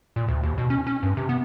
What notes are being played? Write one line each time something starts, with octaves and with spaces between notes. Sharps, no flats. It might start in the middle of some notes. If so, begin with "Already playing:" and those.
A#2
D2
D#2
B2
C#4
C#4
G2
C3
B3